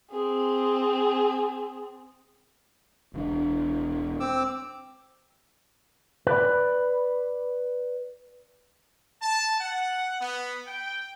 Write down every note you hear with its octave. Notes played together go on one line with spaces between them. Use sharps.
C4 G#4
E1 E2 D4
C4 D6 E6
B4 D5 B5
A5
F#5
B3
G5